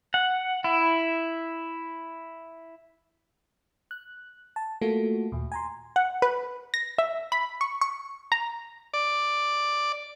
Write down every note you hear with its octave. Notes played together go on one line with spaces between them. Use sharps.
F#5
E4
F#6
A5
A3 A#3 F4 F#4 A4
D#2 A#2
G#5 A#5 C6
F#5
B4
A#6
E5
B5
C#6
C#6
A#5
D5